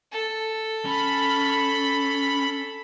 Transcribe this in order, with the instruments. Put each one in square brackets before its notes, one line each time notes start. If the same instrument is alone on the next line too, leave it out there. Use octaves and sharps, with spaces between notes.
[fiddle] A4
[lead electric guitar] C#4 [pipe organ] B5